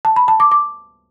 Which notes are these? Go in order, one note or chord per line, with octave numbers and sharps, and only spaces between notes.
A5
B5
A5
D6
D6